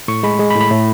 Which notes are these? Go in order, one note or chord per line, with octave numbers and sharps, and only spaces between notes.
A2 C#6
G#3 B5
G#3
B5
A2
B5
A2